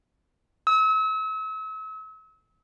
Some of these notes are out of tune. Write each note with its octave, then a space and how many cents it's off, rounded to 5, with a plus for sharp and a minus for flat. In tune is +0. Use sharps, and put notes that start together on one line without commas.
E6 -40